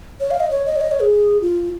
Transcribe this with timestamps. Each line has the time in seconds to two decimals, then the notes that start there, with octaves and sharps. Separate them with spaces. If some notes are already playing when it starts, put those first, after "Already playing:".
0.20 C#5
0.31 F5
0.40 D#5
0.51 C#5
0.66 D#5
0.76 C#5
0.81 D#5
0.91 C#5
1.01 G#4
1.42 F4